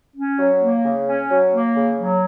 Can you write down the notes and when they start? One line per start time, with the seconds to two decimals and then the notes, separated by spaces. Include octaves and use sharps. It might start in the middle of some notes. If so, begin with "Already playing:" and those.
0.16 C#4
0.39 F#3
0.61 A#3
0.84 C#3
1.06 C#4
1.30 F#3
1.52 A#3
1.75 C#3
1.98 F#3